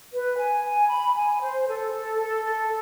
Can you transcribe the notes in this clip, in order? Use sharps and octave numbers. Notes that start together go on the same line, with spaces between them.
B4
G#5
G#5
B5
G#5
C5
A4
A4
A4
A4